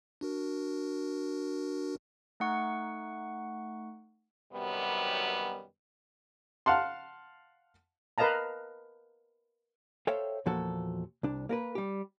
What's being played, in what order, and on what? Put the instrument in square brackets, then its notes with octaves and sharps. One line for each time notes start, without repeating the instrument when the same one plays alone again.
[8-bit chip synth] D4 F#4 A#4
[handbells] A3 D#4 F#5 C#6
[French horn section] F#2 C3 D#3 F#3 G3 B3
[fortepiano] F5 F#5 A5 C6
[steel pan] A#4 B4 D#5 F5 A5 A#5
[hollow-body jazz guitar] A4 C5 C#5 E5 F5 G5
E2 A#2 F3 F#4 A4
C2 D4
A#3 A#4 B4
G3 G4